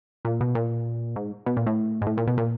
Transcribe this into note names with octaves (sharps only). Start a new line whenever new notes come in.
A#2
B2
A#2
G#2
B2
A#2
A2
G#2
A2
A#2
B2
A#2